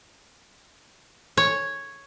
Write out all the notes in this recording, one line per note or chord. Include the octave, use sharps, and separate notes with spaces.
C#5